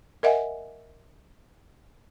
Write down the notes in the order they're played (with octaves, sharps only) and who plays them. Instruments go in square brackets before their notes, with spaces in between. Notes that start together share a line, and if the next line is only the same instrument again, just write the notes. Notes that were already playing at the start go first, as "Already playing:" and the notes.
[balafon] A#4 D#5 E5 F#5 G#5